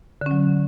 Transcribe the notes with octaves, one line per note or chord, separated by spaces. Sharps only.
D3 F#3 C#4